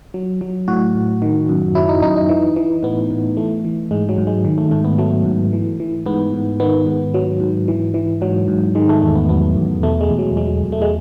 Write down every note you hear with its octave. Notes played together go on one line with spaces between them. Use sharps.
F#3
F#3
A2 F#4
A2
D#3
F#2
F#3 E4
D#4
F#2 D#4
D#4
E3
E3
A2 B3
A2
E3 A3
E3
G#2 G#3
F#3
G#2
G#3
D#3
A3
G#2 A3
B3
F#3 A3
G#2
E3
E3
G#2 B3
G#2
D#3 B3
G#2
F#3
G#2
E3
E3
G#2 F#3
G#2
D#3 G#3
A3
E2 A3
B3
F#3 B3
E2
B2 A3
G#3
E2
F#3
F#3 G#3
E2
A3
G#3